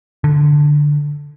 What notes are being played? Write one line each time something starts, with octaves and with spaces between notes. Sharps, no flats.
D3